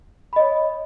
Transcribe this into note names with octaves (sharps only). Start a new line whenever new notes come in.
C#5 D#5 B5